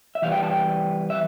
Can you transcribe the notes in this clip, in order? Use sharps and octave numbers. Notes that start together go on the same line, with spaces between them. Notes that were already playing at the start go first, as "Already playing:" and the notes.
E5
E3 G3 B3 F5
G5
A5
G5
E5